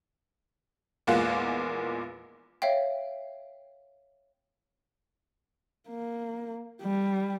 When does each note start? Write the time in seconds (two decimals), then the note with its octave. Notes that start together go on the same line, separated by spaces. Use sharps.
1.07 A#1 E2 G#3 A#3 F4 F#5
2.62 C#5 E5 F5 G5
5.89 A#3
6.82 G3